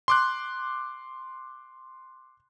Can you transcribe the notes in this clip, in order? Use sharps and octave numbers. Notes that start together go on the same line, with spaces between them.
C6 D6 F#6